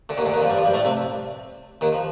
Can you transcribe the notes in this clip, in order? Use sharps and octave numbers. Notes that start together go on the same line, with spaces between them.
D2 D3
D#2 D#3
D2 D3
D#2 D#3
F2 F3
G2 G3
F2 F3
G2 G3
A2 A3
C3 C4
D#2 D#3
F3